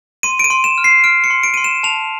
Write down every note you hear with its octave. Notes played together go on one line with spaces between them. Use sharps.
C6 D#7
D7
D#7
C6
E7
F6
C7
F6 D7
C#7
C6
D7
C6 D#7
E7
A5 F7